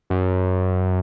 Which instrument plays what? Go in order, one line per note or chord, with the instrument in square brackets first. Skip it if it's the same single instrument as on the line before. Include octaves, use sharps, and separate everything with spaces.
[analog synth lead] F#2